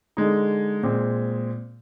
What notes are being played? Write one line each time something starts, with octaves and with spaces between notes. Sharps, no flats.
D3 G#3 D#4
A#2 G#3 C4